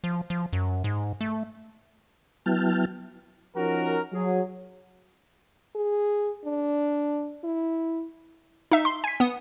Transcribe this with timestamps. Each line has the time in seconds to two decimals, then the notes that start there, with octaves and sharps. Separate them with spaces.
0.04 F3
0.30 F3
0.53 F#2
0.84 G#2
1.21 A3
2.46 F#3 B3 E4 G5 A5 F6
3.55 F3 C#4 D#4 F#4 A#4
4.13 F#3 G#4
5.75 G#4
6.45 D4
7.44 E4
8.71 D#4 E5
8.85 C6
9.04 G#5 B6
9.20 B3 D#6